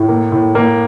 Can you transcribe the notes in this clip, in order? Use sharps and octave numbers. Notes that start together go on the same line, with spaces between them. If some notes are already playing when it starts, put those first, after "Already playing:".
Already playing: A2
A#3
A2
A#3